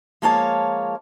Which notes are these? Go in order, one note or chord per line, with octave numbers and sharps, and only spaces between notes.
F3 G#3 A#3 C#5 F5 A5